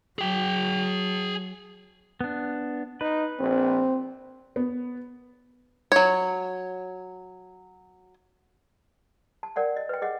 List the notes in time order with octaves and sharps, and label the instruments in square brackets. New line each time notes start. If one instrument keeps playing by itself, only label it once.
[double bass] F#3 [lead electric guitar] G#4 G5
[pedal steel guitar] B3 D4
[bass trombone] D#4 [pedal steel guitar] B4
[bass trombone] A#1 [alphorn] C4
[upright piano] B3
[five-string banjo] F#3 C#5
[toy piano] A5
A#4 D5 F#5 G5
D#5
B4 G5
G#4 D#5 F#5